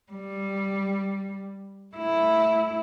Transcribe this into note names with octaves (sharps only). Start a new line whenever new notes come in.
G3
A3 E4